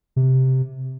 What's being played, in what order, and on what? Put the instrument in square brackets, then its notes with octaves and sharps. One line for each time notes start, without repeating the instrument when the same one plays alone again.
[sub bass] C3